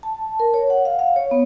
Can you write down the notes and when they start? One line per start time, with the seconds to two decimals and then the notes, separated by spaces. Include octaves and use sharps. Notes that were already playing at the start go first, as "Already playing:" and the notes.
0.03 A5
0.40 A#4
0.54 C#5
0.70 F#5
0.85 F5
0.99 F5
1.16 C#5
1.31 B3